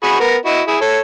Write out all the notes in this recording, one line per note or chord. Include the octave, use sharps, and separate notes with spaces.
F#4 G#4 B5
B3 A#4
E4 F#4 D#5
E4 G#4
A4 C#5